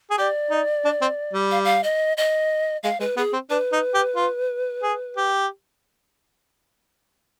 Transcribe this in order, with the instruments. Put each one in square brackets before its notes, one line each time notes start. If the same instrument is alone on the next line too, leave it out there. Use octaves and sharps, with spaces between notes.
[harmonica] G#4
[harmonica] G4 [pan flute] D5
[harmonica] D#4
D4
C4
G3
[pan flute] F5
F5
D#5
D#5
[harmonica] G#3 [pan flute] F5
[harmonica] G#3 [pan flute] B4
[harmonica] B3 [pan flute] G#4
[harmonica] C4
[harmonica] D4 [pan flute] B4
[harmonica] D#4
G4
F4
G#4
G4